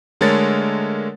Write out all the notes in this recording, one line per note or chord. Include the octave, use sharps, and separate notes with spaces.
D3 G#3 A3 A#4 C#5 A6